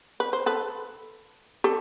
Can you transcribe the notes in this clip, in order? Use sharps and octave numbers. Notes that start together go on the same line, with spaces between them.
B4
C5
A4 B4
G4 A4